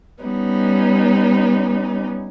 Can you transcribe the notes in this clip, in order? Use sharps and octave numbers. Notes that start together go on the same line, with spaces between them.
G3 B3 C#4 D#4